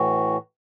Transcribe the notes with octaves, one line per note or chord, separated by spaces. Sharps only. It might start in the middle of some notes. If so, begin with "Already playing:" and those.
Already playing: A2 E3 F#4